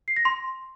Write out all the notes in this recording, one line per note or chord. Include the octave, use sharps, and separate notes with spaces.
C7
A#6
C6